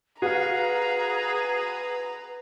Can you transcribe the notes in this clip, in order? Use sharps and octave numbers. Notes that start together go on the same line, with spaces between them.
F#4 G#4 B4 F5 A#5